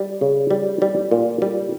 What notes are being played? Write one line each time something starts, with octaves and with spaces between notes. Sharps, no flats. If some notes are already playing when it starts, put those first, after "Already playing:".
Already playing: G3
C#3
G3
G3
A#2
G3